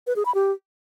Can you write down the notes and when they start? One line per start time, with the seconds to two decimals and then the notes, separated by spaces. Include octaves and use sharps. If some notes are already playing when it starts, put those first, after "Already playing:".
0.07 B4
0.16 G#4
0.25 B5
0.35 G4